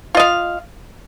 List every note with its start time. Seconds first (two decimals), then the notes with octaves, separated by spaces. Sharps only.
0.15 F4
0.17 D#5
0.20 F5